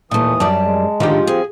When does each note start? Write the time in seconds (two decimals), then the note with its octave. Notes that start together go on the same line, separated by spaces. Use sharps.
0.11 D#2 A#2 E3 A3 D#6
0.40 F#2 G3 D5 A5
0.64 G#3
1.00 A2 D3 D#3 F3 G4
1.27 C4 G#4